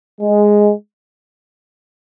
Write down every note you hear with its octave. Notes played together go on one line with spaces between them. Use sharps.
G#3